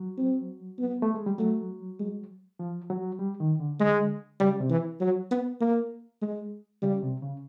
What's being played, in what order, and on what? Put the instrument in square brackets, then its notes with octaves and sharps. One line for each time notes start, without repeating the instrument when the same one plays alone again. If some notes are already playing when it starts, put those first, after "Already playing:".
Already playing: [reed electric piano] F#3
[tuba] C4
B3
[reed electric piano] A3
G#3
G3
[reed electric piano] F#3 [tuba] A3
[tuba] G#3
[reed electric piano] F3
F#3
G3
D#3
D3
[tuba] G#3
[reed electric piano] C#3 [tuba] G3
[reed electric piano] C3
[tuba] E3
F#3
B3
A#3
G#3
[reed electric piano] C#3 [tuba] G3
[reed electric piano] C3
C#3